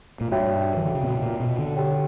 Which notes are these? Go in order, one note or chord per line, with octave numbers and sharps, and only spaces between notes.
A#2
G2 F#4 C#5 E5 G5
E3
D3
C#3
B2
A#2
B2
D3
G4 C#5 G5